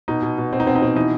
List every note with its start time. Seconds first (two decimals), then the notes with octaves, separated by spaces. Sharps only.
0.08 B2 D#4
0.22 B2
0.38 B2
0.52 B2 C4
0.60 D#4
0.66 B2 C4
0.76 D#4
0.81 B2 C4
0.96 E3 D#4